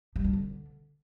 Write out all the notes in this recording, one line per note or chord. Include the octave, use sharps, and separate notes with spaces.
G3
D4
D3